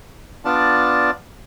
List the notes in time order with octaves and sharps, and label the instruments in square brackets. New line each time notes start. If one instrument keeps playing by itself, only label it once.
[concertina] B3 D4 F4 D5 A5